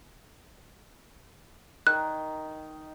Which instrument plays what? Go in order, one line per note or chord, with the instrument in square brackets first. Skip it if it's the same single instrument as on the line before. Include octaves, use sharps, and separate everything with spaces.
[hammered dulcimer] D#3 [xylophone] F#6